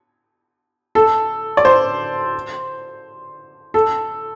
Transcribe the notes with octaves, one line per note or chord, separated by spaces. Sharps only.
A4
D5
C5
A4